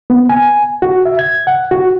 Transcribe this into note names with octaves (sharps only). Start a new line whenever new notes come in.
B3
G#5
F#4
E5
G#6
F#5
F#4